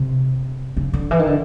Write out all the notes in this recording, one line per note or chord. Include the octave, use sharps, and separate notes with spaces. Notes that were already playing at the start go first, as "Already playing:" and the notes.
Already playing: C3
C#3
D3
E3
D#3
D3